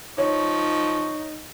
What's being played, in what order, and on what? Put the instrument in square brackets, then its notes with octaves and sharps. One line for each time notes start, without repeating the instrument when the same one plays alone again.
[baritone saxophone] F3 [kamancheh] D#4 [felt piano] C#5 [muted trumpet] C#6